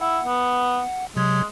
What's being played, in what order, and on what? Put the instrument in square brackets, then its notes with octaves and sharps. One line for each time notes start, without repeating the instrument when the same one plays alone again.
[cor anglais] E4 [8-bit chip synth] F#5
[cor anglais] B3
[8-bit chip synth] C3 F#3 G#6 [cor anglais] G#3